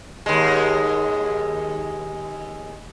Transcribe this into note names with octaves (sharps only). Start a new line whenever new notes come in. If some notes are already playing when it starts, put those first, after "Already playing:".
D#2 G#3